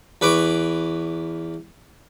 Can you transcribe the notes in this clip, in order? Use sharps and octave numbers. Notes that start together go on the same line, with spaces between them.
E2 B4 C#6 D6